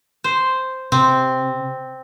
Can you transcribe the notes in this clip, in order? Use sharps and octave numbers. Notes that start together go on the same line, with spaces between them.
C5
C3 C4